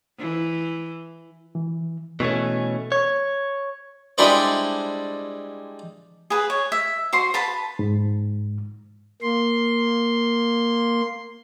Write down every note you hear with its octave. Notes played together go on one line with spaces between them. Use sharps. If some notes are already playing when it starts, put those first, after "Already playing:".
E3
E3
B2 E3 A3 C#4
C#5
G3 G#3 D4 E4 B4 C5
G#4 B4
C#5
E5
F#4 C5 C6
B4 A5 B5
G#2
A#3 C6